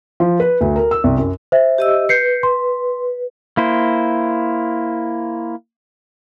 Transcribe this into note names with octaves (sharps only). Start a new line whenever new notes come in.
F3
B4
D2
A#4
E6
C2
F#2
C5 E5
G4 D#5 E6
B4 G6 C7 C#7
C6
A#3 E4 C5